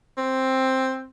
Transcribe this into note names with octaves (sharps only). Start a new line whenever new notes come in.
C4